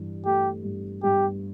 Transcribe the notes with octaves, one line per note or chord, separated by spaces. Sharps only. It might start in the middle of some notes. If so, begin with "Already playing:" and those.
Already playing: G2 E3
A3 G4
G2
G2 G4